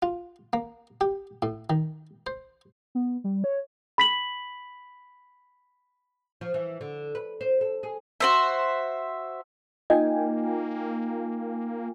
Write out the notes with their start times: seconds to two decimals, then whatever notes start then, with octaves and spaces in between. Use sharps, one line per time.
0.02 F4
0.53 A#3
1.01 G4
1.42 A2
1.70 D#3
2.27 C5
2.95 B3
3.24 G3
3.44 C#5
3.98 B5 B6 F#7
6.41 F3
6.54 E3
6.81 D3
7.15 B4
7.41 C5
7.61 A4
7.83 G#4
8.20 F#4 C5 E5
9.90 A#3 D#4 F4 D#5 G5 G#5